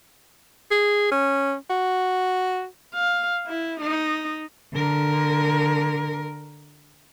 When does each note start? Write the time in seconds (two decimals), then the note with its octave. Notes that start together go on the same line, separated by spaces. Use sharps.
0.71 G#4
1.11 C#4
1.70 F#4
2.94 F5
3.46 E4
3.81 D#4
4.74 D3 A#4